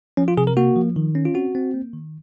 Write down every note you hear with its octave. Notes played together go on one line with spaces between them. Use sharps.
F3 C#4
F4
C3 G#4
A#4
A#3 F#4
F3
D#3
C#4
F4
C4 F#4
C4
A#3
D#3